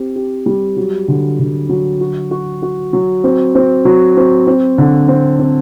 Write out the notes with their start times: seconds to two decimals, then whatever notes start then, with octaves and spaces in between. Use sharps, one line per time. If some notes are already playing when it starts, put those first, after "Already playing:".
Already playing: C4 G4
0.16 G4
0.46 G3
0.77 F#3
1.08 D3
1.39 D3
1.69 F#3
2.01 F#4
2.31 F#4
2.63 F#4
2.93 F#3
3.24 C4
3.55 C4
3.85 F#3
4.17 C4
4.47 C4
4.78 D3
5.08 C4
5.39 C4